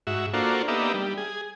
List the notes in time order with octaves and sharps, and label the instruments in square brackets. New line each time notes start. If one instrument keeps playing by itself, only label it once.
[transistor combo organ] G#2 F#4 E5
A#3 D4 F4 F#4 A4 C5
A#3 B3 D4 D#4 G4 E5
G3
G#4